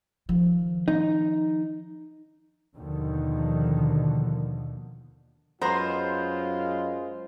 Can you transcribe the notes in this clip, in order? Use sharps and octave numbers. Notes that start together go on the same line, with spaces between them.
D#3 F3
D#4
D#2 B2 D3 D#3 F3
F#2 G#3 B3 F4 C5 A#5 C6